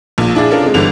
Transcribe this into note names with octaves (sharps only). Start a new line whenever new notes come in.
A#1 A#2
D4 E4 G#4 D5 F5
C#4 D4 F4 A4 A#4
C3 G#3
G1 D3 E3 G3 F7